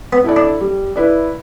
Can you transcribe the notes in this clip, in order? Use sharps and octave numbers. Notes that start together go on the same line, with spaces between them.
B3
E4 A4 D5
D4
G3
E4 B4 D5